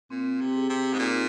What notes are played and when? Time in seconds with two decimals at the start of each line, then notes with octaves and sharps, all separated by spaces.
0.10 A#2 C4
0.41 C3
0.55 G#4
0.70 C3
0.94 G#2
0.99 A#2 D#4